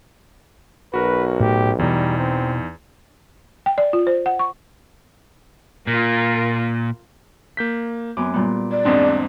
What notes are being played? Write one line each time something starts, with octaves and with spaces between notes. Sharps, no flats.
B1 F#4 A#4 B4
A2 A3 G4
E2 B2 E3 G3 D#4
C4
G5
D5
F4
C5
F#5
C#6
A#2 F4 A#4
A#3 G6 B6
F#2 B3 C4 D6
A#2 G3 B3
D5
E2 G#2 C4 D4 D#4